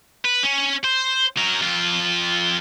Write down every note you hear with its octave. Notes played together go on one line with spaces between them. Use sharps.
B4
C#4
C5
F#3 A#4
F2 F4